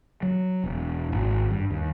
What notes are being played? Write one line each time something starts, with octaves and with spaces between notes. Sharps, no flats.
F#3
E1
G#1
G2
D#2